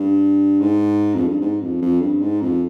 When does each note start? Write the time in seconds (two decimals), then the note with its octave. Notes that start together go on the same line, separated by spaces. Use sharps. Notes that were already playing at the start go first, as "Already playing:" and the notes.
Already playing: G2
0.60 G#2
1.14 F2
1.28 G2
1.41 G#2
1.61 F2
1.81 F2
2.01 G2
2.21 G#2
2.41 F2